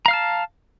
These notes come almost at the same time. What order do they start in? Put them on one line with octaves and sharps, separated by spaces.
A#5 F5 F6 A5